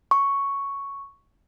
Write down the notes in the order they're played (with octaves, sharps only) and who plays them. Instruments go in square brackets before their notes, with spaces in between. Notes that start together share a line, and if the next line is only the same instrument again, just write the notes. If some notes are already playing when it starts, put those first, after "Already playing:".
[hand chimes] C#6